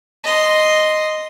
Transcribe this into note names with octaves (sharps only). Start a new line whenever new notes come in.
D#5 C6